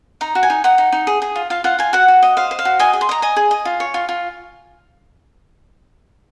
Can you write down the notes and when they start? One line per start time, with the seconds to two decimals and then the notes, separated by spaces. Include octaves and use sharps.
0.21 D#4 A#5
0.35 F#4
0.43 G#5
0.50 D#4
0.64 D#4 F#5
0.78 D#4
0.92 D#4
1.07 G#4
1.22 G#4
1.36 F4
1.50 F4 F5
1.64 F4 F#5
1.79 F4 G#5
1.93 F#4 F#5
2.08 F#4
2.23 D#5
2.37 C5 F5
2.51 C5
2.59 F5
2.65 F#4
2.79 D#5 G#5
2.93 G#4
3.01 C6
3.09 D#5 A#5
3.22 D#5 G#5
3.36 G#4
3.51 D#5
3.65 F4
3.80 C#5
3.94 F4
4.09 F4